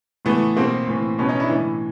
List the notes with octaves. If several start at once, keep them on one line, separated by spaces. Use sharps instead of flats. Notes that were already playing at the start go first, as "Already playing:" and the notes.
A2 E3 A3 B3
B2 A#3 C4
A2 E3
B2 B3 C#4
C#4 D#4
D4 E4
A2 E3